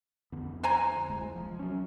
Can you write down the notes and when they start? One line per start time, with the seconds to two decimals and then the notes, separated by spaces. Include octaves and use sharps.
0.32 F2 D3 B3
0.63 C5 G#5 A#5
1.09 D1 C2 G#3
1.35 F3
1.59 F#3 C#4